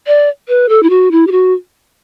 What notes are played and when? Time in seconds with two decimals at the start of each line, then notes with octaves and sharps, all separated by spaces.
0.07 D5
0.48 B4
0.69 A4
0.83 E4
0.90 F#4
1.11 E4
1.27 G4
1.32 F#4